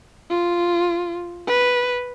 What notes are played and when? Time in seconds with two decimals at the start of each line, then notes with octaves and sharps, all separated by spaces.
0.30 F4
1.47 B4